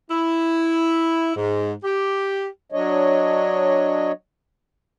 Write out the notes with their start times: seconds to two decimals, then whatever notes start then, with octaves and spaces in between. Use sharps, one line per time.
0.11 E4
1.37 G#2
1.84 G4
2.72 F#3 D4 C#5 D#5